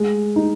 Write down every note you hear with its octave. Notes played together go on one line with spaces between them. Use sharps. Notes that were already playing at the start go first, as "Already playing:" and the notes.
Already playing: G#3
D#4